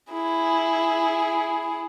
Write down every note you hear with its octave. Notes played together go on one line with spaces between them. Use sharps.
E4 G#4